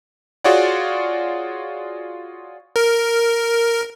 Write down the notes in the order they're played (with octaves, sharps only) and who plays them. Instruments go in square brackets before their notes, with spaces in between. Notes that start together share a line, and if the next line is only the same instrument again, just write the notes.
[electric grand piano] F4 F#4 G#4 C#5 D5 F#5
[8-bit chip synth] A#4